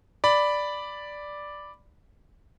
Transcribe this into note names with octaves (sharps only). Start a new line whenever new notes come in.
D5 B5